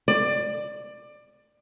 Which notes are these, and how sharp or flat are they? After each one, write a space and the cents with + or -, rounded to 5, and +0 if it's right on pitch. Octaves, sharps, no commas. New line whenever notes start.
D5 +20